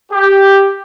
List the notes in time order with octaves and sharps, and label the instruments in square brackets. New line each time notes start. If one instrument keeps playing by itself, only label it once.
[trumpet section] G4